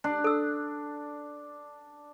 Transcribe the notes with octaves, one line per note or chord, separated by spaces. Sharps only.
D4
A4 E6